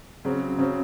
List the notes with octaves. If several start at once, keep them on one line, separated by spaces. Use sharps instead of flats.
C#3 F#3 C4
C#3 F#3 C4